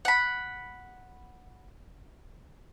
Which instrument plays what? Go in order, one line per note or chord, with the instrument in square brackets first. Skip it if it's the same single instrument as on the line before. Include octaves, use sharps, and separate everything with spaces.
[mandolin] F#5 B5